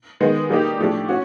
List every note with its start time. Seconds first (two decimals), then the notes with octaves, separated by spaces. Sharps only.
0.20 D#3 G#3 B3
0.50 G3 A#3 D#4 G4
0.78 A2 F3 A3 D4 G4
1.08 C#4 F#4